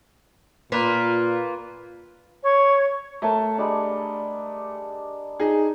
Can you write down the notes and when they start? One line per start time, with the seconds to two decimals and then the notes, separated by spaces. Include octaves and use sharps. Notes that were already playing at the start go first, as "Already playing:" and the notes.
0.72 A#2 A#3 F4 B4
2.43 C#5
3.22 A3 A#4 C#5 A5
3.58 G3 G#3 D4
5.40 D#4 G#4